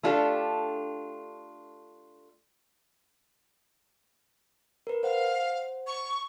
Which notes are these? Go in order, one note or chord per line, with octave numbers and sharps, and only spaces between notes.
A3 D4 F4 G4 A4
A#4 B4
C5 F5 F#5
C#6